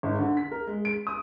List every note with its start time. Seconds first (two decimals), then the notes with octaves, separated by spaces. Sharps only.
0.03 G#1
0.19 D3
0.37 B6
0.51 A#4
0.67 G#3
0.85 D7
1.07 D#6